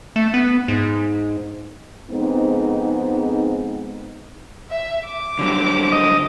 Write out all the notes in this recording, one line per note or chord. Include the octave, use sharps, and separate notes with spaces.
A3
B3
G#2
F2 G#2 G#3 B3 C4 D#4
E5
D6
D3 F#3 G3
D#5